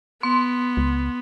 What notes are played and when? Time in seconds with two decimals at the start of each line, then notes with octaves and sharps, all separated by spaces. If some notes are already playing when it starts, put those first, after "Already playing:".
0.23 B3 C6
0.77 C#2